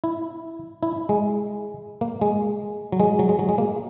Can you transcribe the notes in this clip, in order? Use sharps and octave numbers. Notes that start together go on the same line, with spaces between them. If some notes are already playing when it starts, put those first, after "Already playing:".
E4
E4
G#3
A#3
G#3
F#3
G#3
F#3
G#3
F#3
G#3
A#3